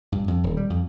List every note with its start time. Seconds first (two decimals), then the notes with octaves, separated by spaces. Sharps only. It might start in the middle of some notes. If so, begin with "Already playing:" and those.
0.12 G2
0.28 F2
0.44 D#1
0.57 G3
0.70 F2